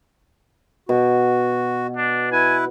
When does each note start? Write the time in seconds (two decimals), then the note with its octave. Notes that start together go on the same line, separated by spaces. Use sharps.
0.89 B2 F#4
1.97 D4
2.32 E4 B4 G#5